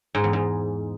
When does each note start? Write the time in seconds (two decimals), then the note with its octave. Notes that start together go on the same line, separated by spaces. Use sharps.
0.15 G#2
0.24 E2
0.33 G#2